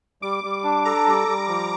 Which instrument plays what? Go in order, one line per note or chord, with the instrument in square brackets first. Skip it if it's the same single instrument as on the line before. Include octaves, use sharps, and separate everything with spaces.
[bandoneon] G3 [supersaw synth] D6
[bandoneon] G3
D4
[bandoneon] A4 [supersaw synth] A#5
[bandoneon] G3
G3
F3